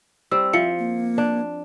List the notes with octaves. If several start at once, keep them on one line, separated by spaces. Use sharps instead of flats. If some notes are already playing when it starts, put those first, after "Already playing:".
G3 C4 E6
F3 E5 C#7
A#3
D4